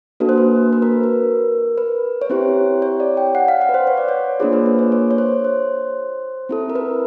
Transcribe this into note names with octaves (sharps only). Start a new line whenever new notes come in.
A#3 D4 F#4 A4 B4
C5
B4
B4
A#4
A#4
B4
C#5
C4 E4 G4 C5
C#5
D5
G5
F#5
F5
F#5
B4
C5
C#5
D5
C#5
A#3 D4 F4 G#4 C5
B4
C5
C#5
C#5
C#5
C5
C5
C4 E4 A4
A#4
B4